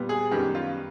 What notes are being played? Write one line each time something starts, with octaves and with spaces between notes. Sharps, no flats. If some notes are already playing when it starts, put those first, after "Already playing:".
Already playing: A#2 G3 B3
G#4
F#2 D#3 G3 B3 G4
F4